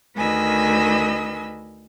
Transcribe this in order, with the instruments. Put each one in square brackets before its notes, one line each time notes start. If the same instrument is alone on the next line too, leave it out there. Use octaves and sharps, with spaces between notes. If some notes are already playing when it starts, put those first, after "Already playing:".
[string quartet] D2 D#3 B4 D#5 G#5 E6